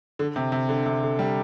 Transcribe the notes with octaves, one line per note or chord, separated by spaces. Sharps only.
D3
C3
C3
D3
C3
D3
G3